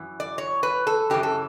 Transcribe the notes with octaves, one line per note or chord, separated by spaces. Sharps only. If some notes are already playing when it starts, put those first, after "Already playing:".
Already playing: F#2 E3
D5
C#5
B4
A4
F#2 C#3 E3 G4
A4